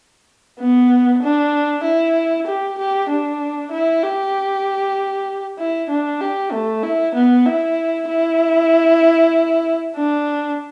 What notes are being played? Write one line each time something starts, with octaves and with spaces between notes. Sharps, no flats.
B3
D4
E4
G4
G4
D4
E4
G4
E4
D4
G4
A3
E4
B3
E4
E4
D4